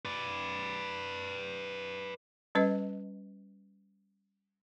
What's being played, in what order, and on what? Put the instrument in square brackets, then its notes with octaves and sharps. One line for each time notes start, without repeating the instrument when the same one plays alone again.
[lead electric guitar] B4 D5
[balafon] G3 C#4 B4 D#5